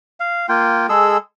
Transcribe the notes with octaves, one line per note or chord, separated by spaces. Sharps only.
F5
A#3 F4 G5
G#3 G#4 A4 E6